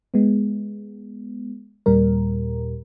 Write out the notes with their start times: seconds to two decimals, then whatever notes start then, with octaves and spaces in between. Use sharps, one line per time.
0.14 G#3 B3
1.86 D#2 A#2 G3 A#4